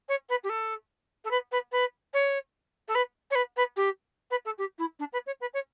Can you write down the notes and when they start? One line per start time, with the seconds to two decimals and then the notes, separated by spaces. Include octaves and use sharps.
0.09 C#5
0.29 B4
0.44 G4
0.49 A4
1.25 A4
1.31 B4
1.52 B4
1.72 B4
2.14 C#5
2.88 A4
2.95 B4
3.31 C#5
3.35 B4
3.57 B4
3.76 G4
4.30 B4
4.45 A4
4.58 G4
4.78 E4
4.99 D4
5.13 B4
5.26 C#5
5.41 B4
5.54 C#5